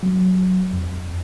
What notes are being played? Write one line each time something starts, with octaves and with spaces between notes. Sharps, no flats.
F#3
F2